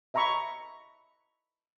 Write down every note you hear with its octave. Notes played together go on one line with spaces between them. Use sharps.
D#5 E5 A#5 B5 C#6